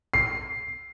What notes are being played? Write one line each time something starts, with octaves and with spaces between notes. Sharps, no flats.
C7